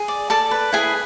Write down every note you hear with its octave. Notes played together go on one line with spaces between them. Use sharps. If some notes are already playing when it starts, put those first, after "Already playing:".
Already playing: G#4
D5
A4 D5 A5
B4
E4 G#4 G#5